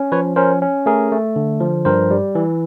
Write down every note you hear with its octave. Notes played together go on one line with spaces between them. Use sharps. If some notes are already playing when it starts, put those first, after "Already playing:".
Already playing: C#4
F3 B4 C#5
C#4 A#4 C5
C#4
A3 G#4 A#4
A3
D3
F3
G2 A#4 C5
G3
E3